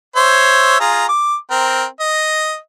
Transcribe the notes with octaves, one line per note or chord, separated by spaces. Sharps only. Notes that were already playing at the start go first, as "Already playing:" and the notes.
C5 C#5 E5
F4 G#4 A#5
D6
C4 A#4
D#5